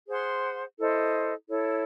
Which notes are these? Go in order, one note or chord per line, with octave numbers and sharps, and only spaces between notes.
G#4 C5 F#5 C6
E4 A4 C5 D#5
E4 A4 C#5